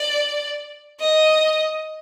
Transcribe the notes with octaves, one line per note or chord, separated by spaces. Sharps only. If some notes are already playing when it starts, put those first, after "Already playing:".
Already playing: D5
D#5